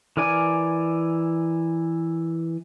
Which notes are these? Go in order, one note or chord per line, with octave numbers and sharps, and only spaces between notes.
E3 A#4 D5 G#5